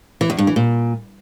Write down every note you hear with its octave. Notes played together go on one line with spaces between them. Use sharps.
E3
E2
G2
E3
A#2